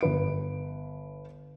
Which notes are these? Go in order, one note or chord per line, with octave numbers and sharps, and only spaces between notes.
G1 B4 D7